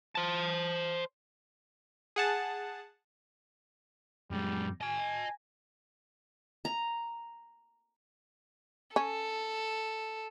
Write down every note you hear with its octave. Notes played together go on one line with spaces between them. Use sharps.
C5 A5
G#4 F#5 A5
F#2 G3 G#3
D#5 G#5 A5
A#5
C#4 A4